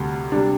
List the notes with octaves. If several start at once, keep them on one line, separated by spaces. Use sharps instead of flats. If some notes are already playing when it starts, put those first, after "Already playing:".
Already playing: D2 C3 G3
C3 G3 D4